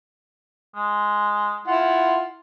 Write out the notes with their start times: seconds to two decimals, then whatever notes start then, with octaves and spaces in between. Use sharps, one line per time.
0.75 G#3
1.67 E4 F4 F#5